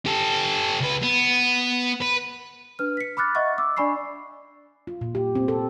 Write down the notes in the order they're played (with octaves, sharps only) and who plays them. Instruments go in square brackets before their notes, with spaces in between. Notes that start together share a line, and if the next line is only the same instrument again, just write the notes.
[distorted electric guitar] G4 A4
C#2 B4
B3
B4
[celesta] D4 B4 F6
B6 C#7
B5 D6 F6 F#6 A6
D#5 E5 F#5 C#6 A6
D6 E6
D4 D5 G#5 B5 C#6 C7
[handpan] F4
A#2
G4
C4
A4